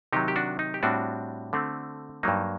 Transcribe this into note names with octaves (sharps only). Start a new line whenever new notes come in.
C3 D#3 F#3 D#4 G4
G4
D4 F#4
D#4
G4
A2 G3 C4 D4 F#4
D3 A3 C4
G2 F#3 A#3 D#4